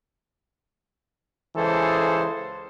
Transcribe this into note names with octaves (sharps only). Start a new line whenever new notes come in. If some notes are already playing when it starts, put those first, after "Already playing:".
C#2 E3 G#4 A4 C5